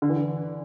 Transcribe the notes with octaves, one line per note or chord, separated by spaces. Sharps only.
D3
E3
D3